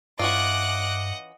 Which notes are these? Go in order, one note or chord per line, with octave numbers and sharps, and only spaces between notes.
G2 E3 C#4 F4 D#5 F#5 D6 F#6